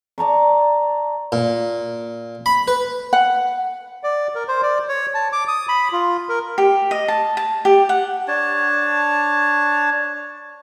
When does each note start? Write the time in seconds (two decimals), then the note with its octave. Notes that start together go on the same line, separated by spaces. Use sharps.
0.18 D5 A5 A#5 C#6
1.32 A#2
2.46 B5
2.68 B4
3.13 F#5
4.03 D5
4.35 A#4
4.48 C5
4.62 D5
4.88 C#5
5.14 A5
5.33 D6
5.48 D#6
5.69 B5
5.92 F4
6.29 A#4
6.58 G4
6.91 D#5
7.08 A5
7.37 A5
7.65 G4
7.89 F#5
8.28 D4 C#5 A5